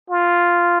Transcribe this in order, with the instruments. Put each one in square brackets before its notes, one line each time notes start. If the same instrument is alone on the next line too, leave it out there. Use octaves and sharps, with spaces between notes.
[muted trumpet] F4